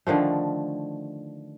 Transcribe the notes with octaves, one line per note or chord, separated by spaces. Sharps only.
D3 D#3 F3 A3